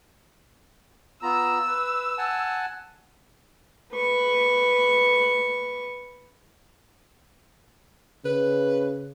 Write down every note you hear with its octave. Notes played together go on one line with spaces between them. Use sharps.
B3 F4 A#5 E6
B4
F#5 G#5 A5
B4 C#6
C#3 B4